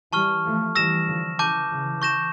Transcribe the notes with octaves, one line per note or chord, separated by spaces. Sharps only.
E3 G3 A5 C#6 F6
F3 A3
E3 G3 E6 A#6 E7
D3 F3
C#3 E3 A5 D6 G6
C#3 E3
C#6 G6 A#6 E7